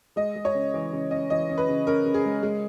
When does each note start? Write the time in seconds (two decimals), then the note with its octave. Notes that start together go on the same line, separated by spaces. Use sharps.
0.16 G#3 D#5
0.36 G#3
0.45 C#5
0.54 C#3
0.74 E3
0.92 C#3
1.11 C#4 D#5
1.30 E3 D#5
1.49 C#4
1.58 B4
1.68 C#3
1.87 C#4 A#4
2.05 C#3
2.14 G#4
2.25 G#3
2.43 G#3